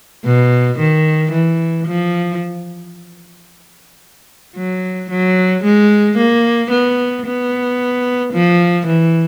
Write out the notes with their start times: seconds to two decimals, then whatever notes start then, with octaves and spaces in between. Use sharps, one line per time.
0.25 B2
0.78 D#3
1.32 E3
1.87 F3
4.56 F#3
5.10 F#3
5.64 G#3
6.17 A#3
6.71 B3
7.26 B3
8.33 F3
8.86 E3